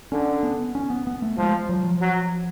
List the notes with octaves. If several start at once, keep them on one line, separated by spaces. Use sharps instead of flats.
D3 C#4
B3
C#4
B3
B3
A3
F3 G#3
F#3
F3
F#3